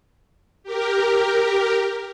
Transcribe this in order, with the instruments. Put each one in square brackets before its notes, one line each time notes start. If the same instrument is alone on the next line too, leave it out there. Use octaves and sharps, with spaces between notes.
[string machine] G4 A#4